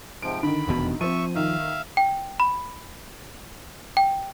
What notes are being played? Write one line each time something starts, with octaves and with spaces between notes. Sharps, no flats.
G#2 C3 F3 D7
D3 D#3 B5
F1 E2 B2
F3 C4 E5 C#6 D#7
D#3 E5 F5
G5
B5
G5